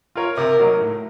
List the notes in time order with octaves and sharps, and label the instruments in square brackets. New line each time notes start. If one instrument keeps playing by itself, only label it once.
[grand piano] F4 A#4 C#5
[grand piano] C3 [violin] A#4
[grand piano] F#3 A#3 D#4 A#4
A2